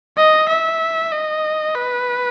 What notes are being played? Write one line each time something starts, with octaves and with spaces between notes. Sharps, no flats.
D#5
E5
D#5
B4